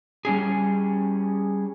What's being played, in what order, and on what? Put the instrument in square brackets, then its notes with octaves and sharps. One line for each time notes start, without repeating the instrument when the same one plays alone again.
[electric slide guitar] G3 C#4 G#4